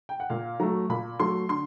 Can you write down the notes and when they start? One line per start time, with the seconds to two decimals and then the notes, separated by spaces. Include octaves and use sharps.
0.09 G5
0.20 F#5
0.30 A#2 F5
0.60 F#3 A3 A#5
0.89 A#2 B5
1.20 F#3 A3 C6
1.49 D3 C6